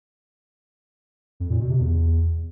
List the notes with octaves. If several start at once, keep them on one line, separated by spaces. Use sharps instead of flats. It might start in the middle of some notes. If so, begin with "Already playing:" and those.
F2
A#2
B2
C3
E2